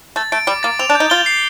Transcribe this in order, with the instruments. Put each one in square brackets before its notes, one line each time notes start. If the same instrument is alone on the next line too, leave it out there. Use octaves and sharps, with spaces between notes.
[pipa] A3 [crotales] A6
[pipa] A3 [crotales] D7
[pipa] G3 [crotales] D6
[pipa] A#3 [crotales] A6
[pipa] C4 [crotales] F7
[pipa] D4
[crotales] G6
[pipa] D#4
[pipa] F4 [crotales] G7
[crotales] C7